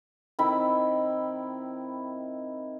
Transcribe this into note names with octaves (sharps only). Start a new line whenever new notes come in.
D#3 C4 E4 B5